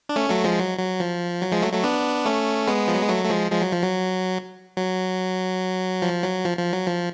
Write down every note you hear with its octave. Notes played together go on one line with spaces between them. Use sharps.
D4
A3 C#4
F#3 A3
F3 G#3
F#3
F#3
F3
F#3
F3 G#3
F#3 A3
F#3 A3
B3 D4
A3 C#4
G#3 B3
F3
F#3
G#3
F#3 A3
A3
F3 G#3
F3 G#3
F#3
F3
F#3
F#3
F3
F#3
F3
F3
F#3
F3